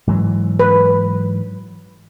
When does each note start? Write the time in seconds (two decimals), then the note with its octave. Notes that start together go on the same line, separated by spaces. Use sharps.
0.07 G#2 E3 F#3
0.60 B4